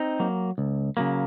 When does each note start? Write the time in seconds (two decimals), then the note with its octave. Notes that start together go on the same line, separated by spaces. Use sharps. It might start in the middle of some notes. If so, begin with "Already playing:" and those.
Already playing: C4 D#4
0.19 F#3 A#3
0.58 C#2
0.97 C#3 F#3 A#3